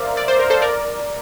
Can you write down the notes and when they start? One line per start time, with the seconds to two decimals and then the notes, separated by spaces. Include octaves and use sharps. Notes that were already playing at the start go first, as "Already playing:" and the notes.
Already playing: A#4 C5 D5 E5 F5
0.17 D5
0.28 C5
0.39 A#4
0.50 A4 C5
0.62 A#4 D5